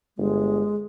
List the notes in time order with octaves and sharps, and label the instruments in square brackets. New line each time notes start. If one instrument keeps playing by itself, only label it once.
[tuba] G1 [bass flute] G#3